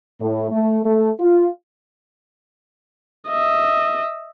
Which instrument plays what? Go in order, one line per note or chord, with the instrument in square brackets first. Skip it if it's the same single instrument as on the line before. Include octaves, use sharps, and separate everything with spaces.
[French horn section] A2
A3
A3
F4
[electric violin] D#5 E5